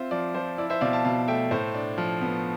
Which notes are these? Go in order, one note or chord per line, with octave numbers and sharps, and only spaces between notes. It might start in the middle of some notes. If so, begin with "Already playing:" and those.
Already playing: C4 F4 C5 E5
F3 D5
F3 C5
E4 D5
C5 E5
B2 D5 F5
F5 A5
B2 F5 A5
A3 E5 G5
A2 C5
D4
F3
B3